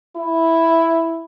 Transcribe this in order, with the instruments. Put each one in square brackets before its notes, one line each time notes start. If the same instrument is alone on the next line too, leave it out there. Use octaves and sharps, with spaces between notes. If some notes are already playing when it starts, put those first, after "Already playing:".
[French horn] E4